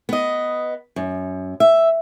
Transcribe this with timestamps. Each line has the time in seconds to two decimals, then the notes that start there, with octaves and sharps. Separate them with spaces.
0.09 B3 D#5
0.96 F#2
1.60 E5